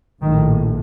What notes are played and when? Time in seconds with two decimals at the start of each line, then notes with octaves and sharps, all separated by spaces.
0.23 A#1 A2 D#3